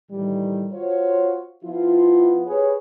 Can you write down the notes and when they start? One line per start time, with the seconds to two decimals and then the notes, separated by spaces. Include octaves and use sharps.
0.12 A2 D#3 E3 G3
0.73 F4 F#4 C5 C#5
1.64 F3 B3 E4 F4
2.46 G4 G#4 B4 C#5